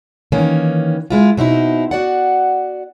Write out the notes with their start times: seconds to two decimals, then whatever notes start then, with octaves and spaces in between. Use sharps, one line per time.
0.32 D#3 E3 A#3 C#4
1.10 G#3 E4 F4
1.37 B2 C4 D#4 E4
1.91 F#4 D5 F#5